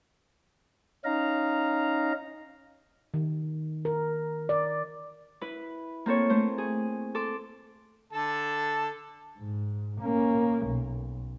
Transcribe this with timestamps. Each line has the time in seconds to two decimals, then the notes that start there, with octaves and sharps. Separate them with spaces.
1.05 C#4 D#4 F5 A#5
3.14 D#3
3.85 A#4
4.49 D5
5.41 E4 B4
6.06 A#3 C4 A4 C#5
6.30 A3 C4 C5
6.58 G#4
7.15 A4 C6 D6
8.13 D3 A4 A5
9.39 G#2
10.01 A#3 C#4
10.67 B1